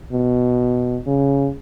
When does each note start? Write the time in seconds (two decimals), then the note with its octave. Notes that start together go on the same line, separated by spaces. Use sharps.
0.12 B2
1.07 C#3